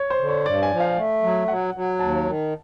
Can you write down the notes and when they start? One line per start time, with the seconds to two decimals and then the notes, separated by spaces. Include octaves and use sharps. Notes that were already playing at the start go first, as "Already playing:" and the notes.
Already playing: C#5
0.10 C5
0.20 D3
0.29 C#5
0.45 G2 D5
0.63 G#5
0.71 F3
0.80 F5
0.96 A3
1.22 F#3
1.48 F#3 F#5
1.74 F#3
1.99 D#2 A5
2.26 D#3